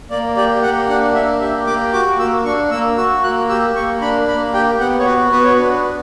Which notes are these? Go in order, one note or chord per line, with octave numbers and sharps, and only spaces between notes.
A#3 D5
G4 D5
A#3 F#5
D4 F#5
A#3 E5
G4 E5
A#3 D6
F#4 D6
A#3 E6
D4 C#6
A#3 E6
F#4 E6
A#3 F#6
G4 E6
A#3 C#6
D4 B5
A#3 B5
G4 G5
B3 F#5
C#5
F#4 B4
B3 B4
C#5
D4 B4
B3